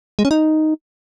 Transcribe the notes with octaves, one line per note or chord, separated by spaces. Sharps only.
G#3
C#4
D#4